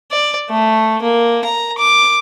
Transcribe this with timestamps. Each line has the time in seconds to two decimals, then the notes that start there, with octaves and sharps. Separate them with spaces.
0.11 D5
0.50 A3
1.03 A#3
1.45 A#5
1.78 D6